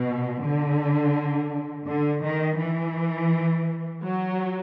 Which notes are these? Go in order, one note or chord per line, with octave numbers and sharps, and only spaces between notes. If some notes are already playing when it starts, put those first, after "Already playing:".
Already playing: B2
D3
D3
D#3
E3
F#3